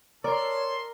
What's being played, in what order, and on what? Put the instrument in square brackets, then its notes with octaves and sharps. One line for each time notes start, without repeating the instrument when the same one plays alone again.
[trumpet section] A4 C6 [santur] A#4 [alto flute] C#5 [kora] D5